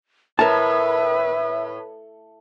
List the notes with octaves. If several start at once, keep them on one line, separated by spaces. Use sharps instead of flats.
A2 A#4 B4 E5 A5